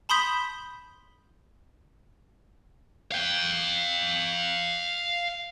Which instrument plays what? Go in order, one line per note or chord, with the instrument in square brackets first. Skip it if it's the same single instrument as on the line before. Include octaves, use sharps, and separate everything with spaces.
[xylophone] A5 B5 C6 D#6 G6 B6
[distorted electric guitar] F5 G5